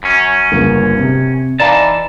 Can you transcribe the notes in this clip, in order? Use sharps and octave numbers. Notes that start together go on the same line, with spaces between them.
F#2 C#4
G1 C#3 A#3
C3
E3 D#4 D5 F5 A5 A#5